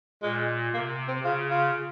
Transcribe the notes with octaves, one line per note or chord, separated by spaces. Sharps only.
A#2 G#3
C3 A#3
C4
C#3 F4
F4